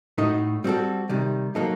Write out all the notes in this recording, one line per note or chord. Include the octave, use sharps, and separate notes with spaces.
A2 A3 D#4 F#4
G3 C4 F#4 A4
C3 D#3 G3
F#3 A#3 D#4 A4